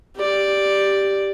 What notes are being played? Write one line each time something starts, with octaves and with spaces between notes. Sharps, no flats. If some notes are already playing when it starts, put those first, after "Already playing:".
G4 D5